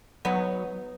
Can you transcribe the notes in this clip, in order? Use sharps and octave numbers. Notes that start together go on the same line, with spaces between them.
F#3 B3 D#4